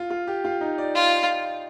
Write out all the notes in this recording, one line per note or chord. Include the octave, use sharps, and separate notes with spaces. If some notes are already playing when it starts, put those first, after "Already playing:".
Already playing: F4
F4
G4
F4
D#4
D5
F4